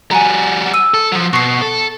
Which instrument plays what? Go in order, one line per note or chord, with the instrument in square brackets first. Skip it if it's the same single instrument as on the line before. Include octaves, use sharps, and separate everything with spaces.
[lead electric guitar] G3 F#4 [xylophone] G#5 A#5
[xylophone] E6 D#7
[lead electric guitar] A4
F3 F#3
[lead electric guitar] B2 [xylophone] C#6 C7
[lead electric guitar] A4